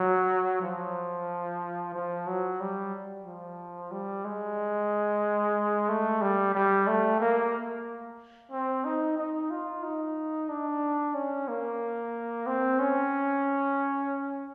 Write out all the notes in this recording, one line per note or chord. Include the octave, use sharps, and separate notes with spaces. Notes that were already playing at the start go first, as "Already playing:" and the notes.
Already playing: F#3
F3
F3
F#3
G3
F3
G3
G#3
A3
G3
G3
A3
A#3
C4
D#4
D#4
F4
D#4
D4
C#4
A#3
C4
C#4